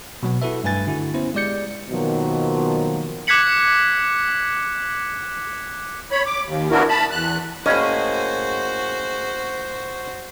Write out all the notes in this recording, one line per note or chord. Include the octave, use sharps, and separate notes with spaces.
B2 F#3 B3
E4 F#4 A4 B4 E5
G2 A3 B4 G#5 A6
D3 E4 F#4
B3 C#4 E4 C5
G#3 G4 D5 G6 C#7
B2 D#3 F3 F#3 A#3
D6 F#6 G#6 B6 C#7 F#7
C#5 B5
D6
D#2
B3 D4 E4 F#4 A#4
A5 B5
E2 F#6
A2 A#3 C#4 F#4 G#4 C5 D#5